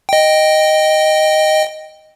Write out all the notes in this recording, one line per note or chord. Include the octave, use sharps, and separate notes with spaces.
D#5 G5